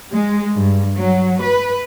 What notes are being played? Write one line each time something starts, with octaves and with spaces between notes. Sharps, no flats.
G#3
G2
F#3
B4